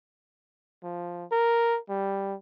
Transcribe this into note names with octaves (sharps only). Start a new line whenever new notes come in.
F3
A#4
G3